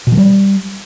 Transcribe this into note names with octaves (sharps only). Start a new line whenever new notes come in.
B2
F3
G3